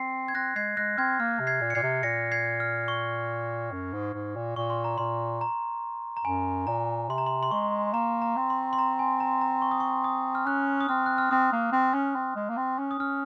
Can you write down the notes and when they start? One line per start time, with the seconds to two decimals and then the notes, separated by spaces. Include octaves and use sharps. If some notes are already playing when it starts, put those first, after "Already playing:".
Already playing: C4 C7
0.28 G#6
0.35 C4 F#6 A#6
0.56 G#3 G#6 C7
0.77 G#3 F#6 A#6
0.98 C4 F6 G#6
1.20 A#3 F6
1.40 C3
1.47 G#6 C7
1.61 A#2
1.70 C#7
1.75 A#2 G#6 C7
1.83 C3
2.03 A#2 A#6 C#7
2.32 G#6 C7
2.60 F6
2.88 C#6
3.72 F#2
3.93 G#2
4.14 G#2
4.36 A#2
4.56 A#2 C#6
4.70 C6
4.84 A#5
4.98 A#2 C6
5.41 A#5
6.17 A#5
6.24 F#2 G#5
6.67 A#2 A#5
7.09 C3 C6
7.18 A#5
7.26 C6
7.43 C6
7.51 G#3 C#6
7.93 A#3 A#5
8.22 A#5
8.36 C4
8.50 C6
8.73 C6
8.79 A#5
8.99 G#5
9.20 A#5
9.41 A#5
9.62 C#6
9.71 D#6
9.80 C#6
10.04 D#6
10.35 F6
10.46 C#4 F#6
10.81 D#6
10.89 C4 F6
11.06 F#6
11.18 F6
11.31 C4 D#6
11.53 A#3
11.73 C4
11.94 C#4
12.16 C4
12.36 G#3
12.50 A#3
12.57 C4
12.79 C#4
12.91 D#6
12.99 C#4 F6